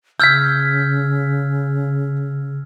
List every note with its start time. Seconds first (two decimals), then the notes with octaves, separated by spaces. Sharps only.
0.20 C#3 E6 F6 G6 G#6 B6